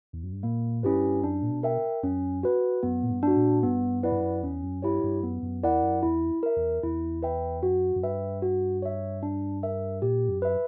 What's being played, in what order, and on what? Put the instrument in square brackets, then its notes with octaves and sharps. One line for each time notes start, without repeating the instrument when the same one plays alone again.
[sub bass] E2
F#2
G2
[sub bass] A#2 [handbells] A#3
[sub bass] G2 [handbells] C#4 E4 G4 B4
[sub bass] F#2 [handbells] D4
[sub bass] A#2
B2
[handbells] A#4 E5 G5
[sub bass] F#2 [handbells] C#4
[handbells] F#4 B4
[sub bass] F#2 [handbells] B3
[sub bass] A#2
G2
[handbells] D4 F#4
[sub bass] A#2
[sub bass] G2 [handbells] B3
[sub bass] F#2 [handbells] E4 B4 D5 F#5
[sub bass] G2
F#2
[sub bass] E2 [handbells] C#4
[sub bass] F#2
[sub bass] G2 [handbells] E4 G4 C#5
[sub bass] G2
[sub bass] F#2 [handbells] B3
[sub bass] F#2
[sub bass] E2 [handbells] E4 A#4 D5 F#5
[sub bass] F#2
[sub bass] E2 [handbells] E4
[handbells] A#4 E5
[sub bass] E2
[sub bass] E2 [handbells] E4
[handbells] B4 E5 G5
[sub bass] F#2 [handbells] F#4
[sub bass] F#2
[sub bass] G2 [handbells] B4 E5 G5
[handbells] F#4
C#5 E5
D4
A#4 E5
[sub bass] A#2 [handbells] G4
[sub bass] F#2
[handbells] B4 E5